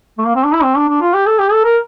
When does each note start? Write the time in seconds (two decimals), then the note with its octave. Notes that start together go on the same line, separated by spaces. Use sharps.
0.18 A3
0.26 A#3
0.36 C4
0.44 D4
0.54 E4
0.64 C4
0.77 D4
0.89 D4
1.02 F4
1.14 G4
1.27 A4
1.39 G4
1.52 A4
1.65 A#4